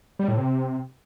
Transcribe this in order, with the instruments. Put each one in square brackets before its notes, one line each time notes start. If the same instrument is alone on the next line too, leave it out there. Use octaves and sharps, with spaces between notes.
[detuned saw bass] G3
A2
C3